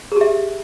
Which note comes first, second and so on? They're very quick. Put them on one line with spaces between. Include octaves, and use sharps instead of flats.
G#4 G4 E5